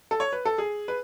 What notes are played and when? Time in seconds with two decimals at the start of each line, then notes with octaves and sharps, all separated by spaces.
0.11 A4
0.20 C#5
0.33 B4
0.45 A4
0.58 G#4
0.88 B4